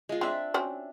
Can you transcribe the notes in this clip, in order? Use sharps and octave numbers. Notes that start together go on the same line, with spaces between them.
G#3 F4
C4 D4 F4 E5
C4 C#4 F#4